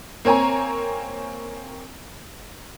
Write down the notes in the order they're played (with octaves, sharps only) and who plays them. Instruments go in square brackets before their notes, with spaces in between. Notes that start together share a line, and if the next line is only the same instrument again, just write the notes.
[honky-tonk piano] A#3 C4 C#5 G#5 A#5